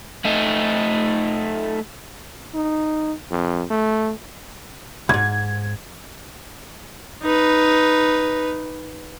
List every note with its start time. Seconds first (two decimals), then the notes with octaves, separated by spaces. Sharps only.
0.25 A3 D#4
2.54 D#4
3.31 F2
3.70 A3
5.09 C2 G#2 G#6
7.23 D#4 B4